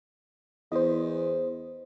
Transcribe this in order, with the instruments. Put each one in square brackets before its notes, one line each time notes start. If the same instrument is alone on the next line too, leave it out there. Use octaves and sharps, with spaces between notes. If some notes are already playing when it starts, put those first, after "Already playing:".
[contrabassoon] E2 [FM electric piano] C5 D#5